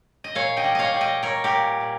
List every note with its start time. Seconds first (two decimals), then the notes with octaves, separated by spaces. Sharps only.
0.24 D#5
0.35 A#2 C#5 F5
0.57 D#5 G5
0.64 G3
0.75 C#5 D#5 F5
0.94 G3
1.01 D#5 G5
1.23 G3 A#4 C#5
1.44 G4 A#4
1.52 A#2
1.80 A#2